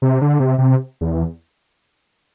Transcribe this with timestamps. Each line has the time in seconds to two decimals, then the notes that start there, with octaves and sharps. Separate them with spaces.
0.02 C3
0.21 D3
0.40 C3
0.58 C3
1.01 E2